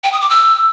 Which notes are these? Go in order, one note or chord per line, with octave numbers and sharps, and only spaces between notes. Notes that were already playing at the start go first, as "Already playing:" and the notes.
G5
D#6
D6
E6